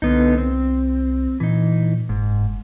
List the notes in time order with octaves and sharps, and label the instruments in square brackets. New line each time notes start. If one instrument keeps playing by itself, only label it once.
[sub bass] C2 [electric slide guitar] D3 B3 D#4
[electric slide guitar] C4
[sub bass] A#2 [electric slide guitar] E3 D#4
[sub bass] F#1 [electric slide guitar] G#2